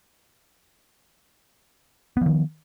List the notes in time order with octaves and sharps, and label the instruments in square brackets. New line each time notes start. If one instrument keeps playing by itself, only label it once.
[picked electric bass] B3
F3
D#3